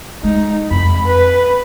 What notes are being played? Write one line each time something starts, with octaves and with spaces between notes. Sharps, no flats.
G#3 D#4
F2 B5
B4